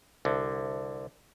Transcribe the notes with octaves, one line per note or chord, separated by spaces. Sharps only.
C2 D3